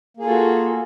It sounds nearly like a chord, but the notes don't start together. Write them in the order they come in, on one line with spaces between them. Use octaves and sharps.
A#3 G#4 F4 A4 F#4